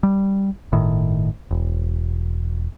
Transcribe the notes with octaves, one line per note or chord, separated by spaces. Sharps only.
G3
G1 A2 D#3
E1